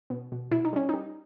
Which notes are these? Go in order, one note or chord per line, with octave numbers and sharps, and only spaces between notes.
B2
B2
B2 E4
D#4
G3 C#4
G3 D#4